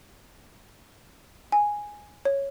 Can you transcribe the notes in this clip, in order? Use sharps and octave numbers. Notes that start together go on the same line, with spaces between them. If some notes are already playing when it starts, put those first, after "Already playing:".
G#5
C#5